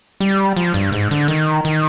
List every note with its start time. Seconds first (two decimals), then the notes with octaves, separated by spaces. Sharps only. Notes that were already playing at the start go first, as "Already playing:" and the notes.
0.20 G3
0.56 F3
0.74 G2
0.92 G#2
1.11 D3
1.28 D#3
1.65 D#3